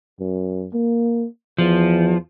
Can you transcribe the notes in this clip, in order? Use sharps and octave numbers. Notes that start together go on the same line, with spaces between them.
F#2
A#3
E2 F3